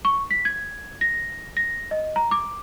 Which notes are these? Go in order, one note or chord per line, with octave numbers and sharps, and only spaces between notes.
C#6
B6
G#6
A#6
A#6
D#5
A#5
D6